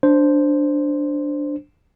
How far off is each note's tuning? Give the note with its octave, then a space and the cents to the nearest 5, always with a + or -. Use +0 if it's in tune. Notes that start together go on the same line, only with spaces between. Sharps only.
D4 +0 C5 +0